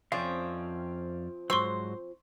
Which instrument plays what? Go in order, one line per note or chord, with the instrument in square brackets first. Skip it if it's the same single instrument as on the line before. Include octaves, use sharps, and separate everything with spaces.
[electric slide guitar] F2 D5 F5 [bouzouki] F3 C4 E5 [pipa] C#4
[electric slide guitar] G#2 F#3 [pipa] C5 [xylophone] C6 C#6 E6